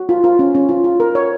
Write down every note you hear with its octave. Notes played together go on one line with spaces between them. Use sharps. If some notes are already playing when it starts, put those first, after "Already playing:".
Already playing: F#4
F4
F4
C#4
C#4
F4
F4
A#4
C#5